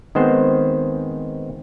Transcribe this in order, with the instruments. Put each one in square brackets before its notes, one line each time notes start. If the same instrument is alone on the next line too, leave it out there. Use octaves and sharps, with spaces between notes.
[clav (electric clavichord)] D#3 G#3 B3 C4 C5